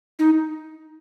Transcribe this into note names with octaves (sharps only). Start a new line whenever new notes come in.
D#4